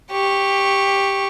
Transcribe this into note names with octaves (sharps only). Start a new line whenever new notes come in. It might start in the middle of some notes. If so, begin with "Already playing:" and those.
G4 C#6